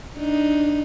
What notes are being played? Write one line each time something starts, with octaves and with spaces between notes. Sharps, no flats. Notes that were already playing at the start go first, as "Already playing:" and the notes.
D4 D#4